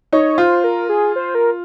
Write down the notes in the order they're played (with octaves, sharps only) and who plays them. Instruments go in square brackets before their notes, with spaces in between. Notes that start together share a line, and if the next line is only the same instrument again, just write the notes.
[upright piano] D#4 [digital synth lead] C#5
[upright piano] F4 [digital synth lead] C5
[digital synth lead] A#4
G#4
C5
A#4